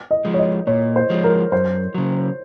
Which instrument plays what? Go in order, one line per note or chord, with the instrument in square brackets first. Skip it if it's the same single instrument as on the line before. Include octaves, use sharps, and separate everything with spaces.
[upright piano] D#5
[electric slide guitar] F3 G#3
[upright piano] C#5
D#5
[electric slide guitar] A#2 [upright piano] C#5
[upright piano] C5
[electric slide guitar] F3 G#3
[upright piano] A#4
[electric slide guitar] F#2 [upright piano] C5
[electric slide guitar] C#3 F#3